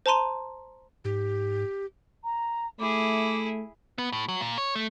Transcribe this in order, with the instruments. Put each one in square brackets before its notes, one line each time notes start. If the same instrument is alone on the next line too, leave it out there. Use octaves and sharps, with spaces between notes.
[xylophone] C5 A5 A#5 C6 D#7
[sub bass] G#2 [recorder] G4
[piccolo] A#5
[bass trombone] A3 [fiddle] E4 G#4 [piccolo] D6
[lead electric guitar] B3
A2
F#3
A#2
C#5
A3